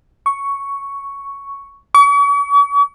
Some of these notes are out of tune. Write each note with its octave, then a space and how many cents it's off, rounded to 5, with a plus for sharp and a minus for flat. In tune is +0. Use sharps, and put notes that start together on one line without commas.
C#6 +5
C#6 +45